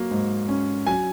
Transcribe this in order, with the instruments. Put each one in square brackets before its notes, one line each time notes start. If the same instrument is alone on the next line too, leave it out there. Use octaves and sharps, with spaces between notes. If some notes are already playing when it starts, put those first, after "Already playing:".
Already playing: [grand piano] F#3 A#3
G#2
C#4
F#3 G#5